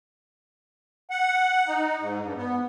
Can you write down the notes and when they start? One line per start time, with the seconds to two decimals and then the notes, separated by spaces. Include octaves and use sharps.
1.11 F#5
1.67 D#4
2.00 G#2
2.23 G2
2.36 B3